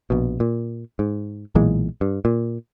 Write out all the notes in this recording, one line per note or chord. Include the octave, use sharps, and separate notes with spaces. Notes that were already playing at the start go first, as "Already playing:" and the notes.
A#1 B2
A#2
G#2
B1 A#2 E3 G#3
G2
A#2